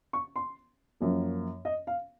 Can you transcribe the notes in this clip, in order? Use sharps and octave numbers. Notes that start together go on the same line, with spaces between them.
C#6
C6
F#2 F3 A#3
D#5
F5